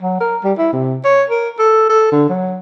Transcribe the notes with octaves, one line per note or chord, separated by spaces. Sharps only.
F#3
A#4
G3
E4
C3
C#5
A#4
A4
A4
D3
F#3